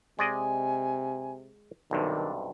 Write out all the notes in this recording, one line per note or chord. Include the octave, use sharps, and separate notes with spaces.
C3 G#3 D5 D#5 G#5
B1 G2 C3 D#3 D4